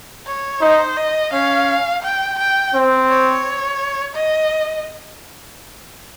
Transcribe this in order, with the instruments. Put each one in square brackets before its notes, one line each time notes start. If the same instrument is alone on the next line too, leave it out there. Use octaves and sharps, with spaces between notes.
[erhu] C#5
[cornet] D#4 [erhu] C5
[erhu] D#5
[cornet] C#4 [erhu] F5
[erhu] G5
G5
[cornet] C4
[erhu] C#5
D#5